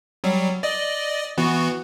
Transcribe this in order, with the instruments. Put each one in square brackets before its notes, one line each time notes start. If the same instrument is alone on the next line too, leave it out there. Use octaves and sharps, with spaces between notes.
[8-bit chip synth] F#3 G3
D5 D#5
E3 B3 F#4